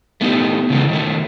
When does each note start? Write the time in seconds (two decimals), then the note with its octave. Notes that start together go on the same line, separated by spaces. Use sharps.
0.21 A3 B3 D#4 G4
0.70 C#3 E3 G#3 A4
0.89 D#3 F#3 A3